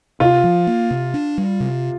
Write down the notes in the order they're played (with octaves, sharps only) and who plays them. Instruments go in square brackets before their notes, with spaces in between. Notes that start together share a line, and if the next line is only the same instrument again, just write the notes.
[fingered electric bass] C3 [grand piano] F4
[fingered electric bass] F3
A#3
C3
D4
G3
C3